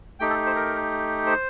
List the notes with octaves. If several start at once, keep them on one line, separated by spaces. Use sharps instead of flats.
A3 D#4 G4 G5
A4
C5
A#4
C5